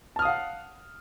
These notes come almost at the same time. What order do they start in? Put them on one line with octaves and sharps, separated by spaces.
A5 F6 D#6 F5 F#5